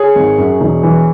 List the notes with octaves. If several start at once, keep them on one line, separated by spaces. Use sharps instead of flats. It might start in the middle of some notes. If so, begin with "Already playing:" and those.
Already playing: G#4 C#5
G#1
F#2
E1
E3